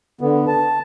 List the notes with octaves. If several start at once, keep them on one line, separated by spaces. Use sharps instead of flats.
D3 B3
A5